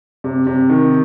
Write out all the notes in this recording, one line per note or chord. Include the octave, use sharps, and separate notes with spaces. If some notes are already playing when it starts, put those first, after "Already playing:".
C3
C3
D#3